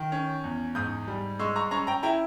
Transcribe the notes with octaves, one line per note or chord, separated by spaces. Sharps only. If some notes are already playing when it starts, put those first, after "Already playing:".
Already playing: D#3
C#4
E2
G#2 D#6 G6
G3
G#3 C#6 E6
A#5 C#6
C#4 A#5 C#6
G5 A#5
E4 G5 A#5